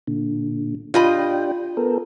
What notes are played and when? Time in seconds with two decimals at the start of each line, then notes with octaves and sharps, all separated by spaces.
0.07 A#2 D3
0.94 D4 F4 G4 D#5 G5 B5
1.77 B3 A4 A#4